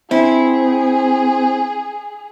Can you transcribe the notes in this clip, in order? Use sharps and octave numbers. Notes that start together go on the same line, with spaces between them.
C4 E4 G#4